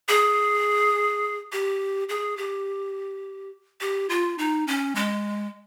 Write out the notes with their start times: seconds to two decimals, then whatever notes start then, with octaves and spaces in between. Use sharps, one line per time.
0.09 G#4
1.52 G4
2.09 G#4
2.38 G4
3.81 G4
4.09 F4
4.38 D#4
4.67 C#4
4.95 G#3